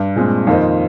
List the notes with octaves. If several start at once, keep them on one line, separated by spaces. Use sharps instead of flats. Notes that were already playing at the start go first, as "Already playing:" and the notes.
Already playing: G2
A#2 G#3 C4
F2 D#3 A#3 F4 C5 D#5